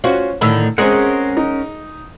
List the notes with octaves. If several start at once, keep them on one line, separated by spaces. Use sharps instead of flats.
C#4 F4 F#4 C5
A2 D3 D#3 B5 E6
G#3 C4 C#4 G#4 A#4 F#5
D#4